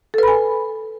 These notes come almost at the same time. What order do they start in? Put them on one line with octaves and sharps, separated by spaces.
A4 B4 B5 G#5